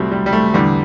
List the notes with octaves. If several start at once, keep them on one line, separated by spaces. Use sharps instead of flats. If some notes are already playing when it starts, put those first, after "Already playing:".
Already playing: C2 F#3 G3 A3 C4
G3
G3
A3
E2 D3 G3